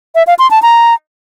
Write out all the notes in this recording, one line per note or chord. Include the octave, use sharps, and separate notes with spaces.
E5
F5
C6
A5
A#5